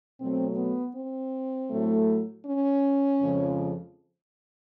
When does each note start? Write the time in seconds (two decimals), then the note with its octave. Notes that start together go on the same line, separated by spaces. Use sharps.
0.20 B2 F#3 A3 C4
0.57 B3
0.95 C4
1.70 A2 F#3 A3
2.46 C#4
3.21 F2 C#3 F3 G#3